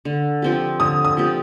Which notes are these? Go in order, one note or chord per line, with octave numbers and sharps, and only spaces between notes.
D3
F3 C4 G4
D3 D#6
D#6
F3 C4 G4